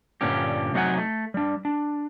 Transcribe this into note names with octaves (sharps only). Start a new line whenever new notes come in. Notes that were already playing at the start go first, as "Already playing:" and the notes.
G2 A#2 D3 C#4 G4
C3 F#3 D#4 F#4 F#5 G#5
A3
G3 D4
D4